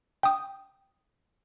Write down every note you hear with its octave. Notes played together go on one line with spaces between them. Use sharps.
G5 D#6